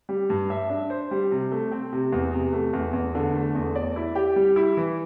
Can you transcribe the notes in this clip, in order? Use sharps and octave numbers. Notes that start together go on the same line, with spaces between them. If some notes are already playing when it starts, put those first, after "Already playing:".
G3
G2
E5
D4
C5
G3
C3
A3
C4
C3
E2
C3
A3
E2
E2
D3
A3
E2
D5
E4
G4
G3
E4
E3